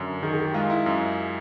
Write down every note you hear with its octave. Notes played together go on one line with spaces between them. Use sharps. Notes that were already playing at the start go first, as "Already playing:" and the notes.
Already playing: F#2 D3
D#3 G#4
G#4
G4
G#3 F4
E4
F#2